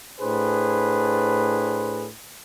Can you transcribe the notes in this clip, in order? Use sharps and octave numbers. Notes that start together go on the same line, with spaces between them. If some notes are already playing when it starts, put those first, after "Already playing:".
A2 D4 G#4 B4 C5